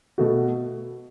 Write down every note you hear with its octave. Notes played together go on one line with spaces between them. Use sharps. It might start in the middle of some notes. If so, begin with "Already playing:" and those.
B2 A3 F#4